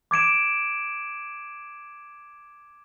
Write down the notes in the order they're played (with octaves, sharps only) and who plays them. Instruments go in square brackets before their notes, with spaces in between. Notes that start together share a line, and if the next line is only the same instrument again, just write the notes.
[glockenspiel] D6 G#6 D7 E7